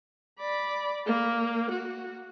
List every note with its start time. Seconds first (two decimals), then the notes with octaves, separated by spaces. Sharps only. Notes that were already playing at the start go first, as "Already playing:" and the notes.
0.39 D5 B5
1.06 A#3
1.70 F#4